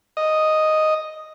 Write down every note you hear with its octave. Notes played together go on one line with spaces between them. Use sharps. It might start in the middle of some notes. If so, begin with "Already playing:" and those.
D#5